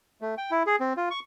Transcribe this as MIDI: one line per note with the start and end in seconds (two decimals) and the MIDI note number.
0.21 0.35 57
0.38 0.51 79
0.51 0.63 64
0.67 0.76 68
0.80 0.93 60
0.97 1.09 65
1.11 1.20 85